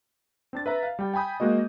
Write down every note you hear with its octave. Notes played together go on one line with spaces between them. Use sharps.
C4 D4 A6
B4 E5 A#5
F5
G3 G5
G5 G#5 B5 D#6 G6
G#3 A#3 F#4 D#5